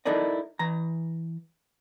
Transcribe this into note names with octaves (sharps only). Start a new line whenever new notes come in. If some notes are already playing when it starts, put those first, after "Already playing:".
D#4 E4 A4 A#4 D5 D#5
E3 A#5